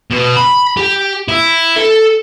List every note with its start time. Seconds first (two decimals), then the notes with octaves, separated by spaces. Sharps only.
0.10 B2
0.37 B5
0.77 G4
1.28 E4
1.77 A4